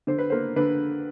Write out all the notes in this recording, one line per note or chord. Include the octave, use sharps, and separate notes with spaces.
D3 C5
B4
A#3 C5
D3 B4